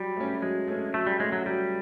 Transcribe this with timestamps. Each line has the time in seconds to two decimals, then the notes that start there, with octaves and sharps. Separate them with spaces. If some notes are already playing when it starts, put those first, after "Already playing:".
Already playing: F#3 G3
0.16 A3 C#4
0.42 F#3 G#3
0.68 A3 C#4
0.94 F#3 A3
1.07 G3
1.20 G#3 A3 C#4
1.32 F#3
1.46 F#3 G3